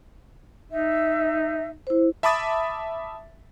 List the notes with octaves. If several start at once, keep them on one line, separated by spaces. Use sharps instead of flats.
D#4 E5
E4 C5
E5 A5 B5 D6 D#6 A6